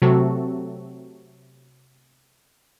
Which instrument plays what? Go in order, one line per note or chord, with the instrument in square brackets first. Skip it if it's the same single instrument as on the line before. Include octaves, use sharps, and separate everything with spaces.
[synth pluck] C3 F#3 A3 C4 F#4 A4